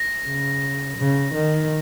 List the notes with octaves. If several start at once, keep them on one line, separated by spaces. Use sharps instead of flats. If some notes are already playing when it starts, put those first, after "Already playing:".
Already playing: A#6
C#3
C#3
D#3